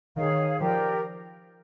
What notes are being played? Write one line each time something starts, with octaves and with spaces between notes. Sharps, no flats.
D#3 G#4 C#5 F5
F3 G4 A#4 D5 G5